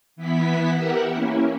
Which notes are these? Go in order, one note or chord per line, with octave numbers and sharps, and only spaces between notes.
E3 B3 E4 B6
G4 A#4 E5 F#5
A#3 C#4 E4